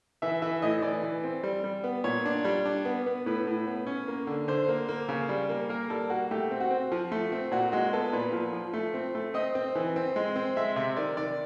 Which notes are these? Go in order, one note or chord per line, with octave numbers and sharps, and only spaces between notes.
E3 E5
E3 E5
A2 D#5
E3 D5
E3
C4
G3
G3
B3
A#2 C#5
D4
G3
D4
B3
B3
A2 B4
A2
B3
C#4
A#3
D3
D3 C5
A#3
A#3
C#3
G3
A#3
A#3 A#4
G3 A4
A#3 F#4
A3 G4
C4
F#4
C4
F3
A3
C4
A#2 F#4
G#3 F#4
B3 A4
A#2 B4
F3
F3
A3
C4
A3
C4 D#5
C4
E3
C4
G#3
C4
G#3 E5
C3 E5
D#3 D5
D#3 D5